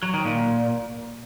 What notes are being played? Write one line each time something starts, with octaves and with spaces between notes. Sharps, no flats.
F#3
D#3
A#2